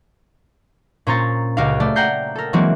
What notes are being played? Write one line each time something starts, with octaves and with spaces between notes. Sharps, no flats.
A#2 C#4 C5 A#5 C#6 A6
C#2 F#4 G4 A#4 F5
A3 D5
F#5 G5 A#5 G6 C7
A4 A#4
E3 F#3 G#3 A#3 C4 F#4